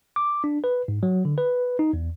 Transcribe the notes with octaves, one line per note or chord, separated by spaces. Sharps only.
D6
D4
B4
G#2
F#3
D3
B4
D#4
E2